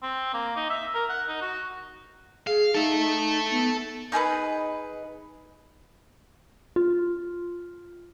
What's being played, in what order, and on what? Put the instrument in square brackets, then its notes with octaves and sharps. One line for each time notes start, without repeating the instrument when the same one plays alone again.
[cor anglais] C4
A#3
D#4
E5
A#4
F#5
D#4
F#4
[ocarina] G#4 [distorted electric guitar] F5
[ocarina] D#4 [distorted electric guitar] A4 E5
[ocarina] B3
[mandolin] D#4 G#4 A4 B4
[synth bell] F4